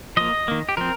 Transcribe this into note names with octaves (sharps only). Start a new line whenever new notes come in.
F3 A#3 D#5
D#3 A#3
G4
F3 C4 A#4